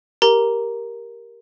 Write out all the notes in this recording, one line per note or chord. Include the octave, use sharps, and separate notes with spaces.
G4 A#4 A#5